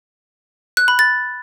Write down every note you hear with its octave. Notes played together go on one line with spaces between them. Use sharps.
F#6
B5
A6